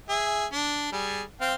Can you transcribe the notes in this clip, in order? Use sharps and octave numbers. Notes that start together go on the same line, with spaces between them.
G#4 E5
D4
G3 G#4
C4 F5 G5